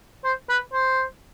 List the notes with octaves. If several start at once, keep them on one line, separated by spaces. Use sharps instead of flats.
C5
B4
C5